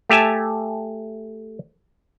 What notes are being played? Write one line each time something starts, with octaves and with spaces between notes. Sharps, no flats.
A3 G4 E5 G#5 A5